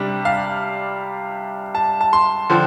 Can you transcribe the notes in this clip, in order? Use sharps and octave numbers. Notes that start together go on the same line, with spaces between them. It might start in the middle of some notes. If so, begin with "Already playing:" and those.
Already playing: C3 G3 D4
F5
A5
A5
C6
D3 F3 C4